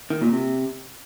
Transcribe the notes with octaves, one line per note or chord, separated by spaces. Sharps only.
D#3
A#2
C3